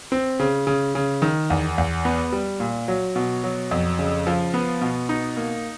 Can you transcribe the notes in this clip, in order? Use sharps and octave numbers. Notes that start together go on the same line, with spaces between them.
C4
C#3
C#3
C#3
D#3
E2
E2
B3
G3
A#2
F#3
B2
F#3
F2
C#3
F3
B3
B2
D#4
A#3